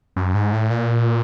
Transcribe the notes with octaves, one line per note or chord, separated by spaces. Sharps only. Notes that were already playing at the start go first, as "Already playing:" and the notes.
F#2
G#2
A2
A#2